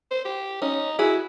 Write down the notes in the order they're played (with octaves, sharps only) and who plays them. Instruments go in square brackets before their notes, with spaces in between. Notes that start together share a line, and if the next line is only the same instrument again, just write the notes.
[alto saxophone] C5
G4
[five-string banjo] C#4 [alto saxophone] D#4
[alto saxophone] E4 [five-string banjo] F#4 G#4